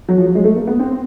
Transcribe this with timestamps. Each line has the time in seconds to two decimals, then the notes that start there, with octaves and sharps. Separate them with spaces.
0.09 F#3
0.18 F3
0.26 F#3
0.35 G#3
0.44 A3
0.56 A#3
0.67 B3
0.79 C4